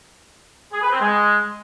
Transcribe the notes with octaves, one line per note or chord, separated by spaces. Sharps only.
G#4
B4
C4
G#3